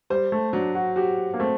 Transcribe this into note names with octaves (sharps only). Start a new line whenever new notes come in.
G3 C5
A3
F#3 D4
F#4
F#4 G4
A#3
A3 C4